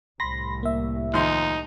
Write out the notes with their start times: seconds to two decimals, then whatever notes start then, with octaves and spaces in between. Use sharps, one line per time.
0.20 C2 A2 B5 C6 A#6
0.63 A#3 E5
1.14 D#2 F3 D#4 C6